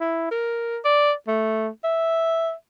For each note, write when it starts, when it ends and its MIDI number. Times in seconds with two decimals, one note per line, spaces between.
0.01 0.27 64
0.31 0.79 70
0.85 1.12 74
1.27 1.68 57
1.84 2.52 76